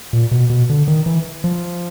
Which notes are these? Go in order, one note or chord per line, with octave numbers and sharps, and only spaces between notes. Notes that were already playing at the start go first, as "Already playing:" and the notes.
A#2
B2
B2
D3
D#3
E3
F3